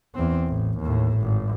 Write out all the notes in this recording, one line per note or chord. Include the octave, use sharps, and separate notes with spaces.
E2 C4
A1
D#2 A2
G#1